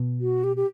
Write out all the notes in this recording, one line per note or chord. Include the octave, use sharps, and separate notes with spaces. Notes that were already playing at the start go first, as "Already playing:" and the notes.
Already playing: B2
F#4
G4
G4